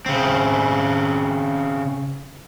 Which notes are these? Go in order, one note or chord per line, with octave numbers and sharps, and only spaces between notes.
C#3 C4